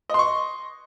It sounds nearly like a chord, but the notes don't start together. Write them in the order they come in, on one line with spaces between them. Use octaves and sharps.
D#5 C6 C#6